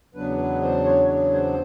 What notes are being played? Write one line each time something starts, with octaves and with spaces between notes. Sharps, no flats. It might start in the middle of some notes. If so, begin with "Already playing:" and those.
E2 C#3 F#3 B3 D4 B4
B4
C5
C#5
C#5
C5